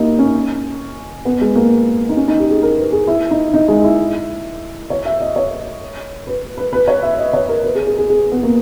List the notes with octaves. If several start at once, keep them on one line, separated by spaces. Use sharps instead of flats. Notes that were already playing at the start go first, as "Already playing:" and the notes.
Already playing: A#3 D#4 E4 G4
C#4
B3
G#3
A#3
D#4
C#4
D#4
G4
G#4
A#4
B4
G#4
E4
D#4
D#4
G#3
E4
C#5
E5
D#5
C#5
B4
B4
B4
C#5
E5
D#5
C#5
A#4
B4
G#4
G#4
G#4
G#4
B3
A#3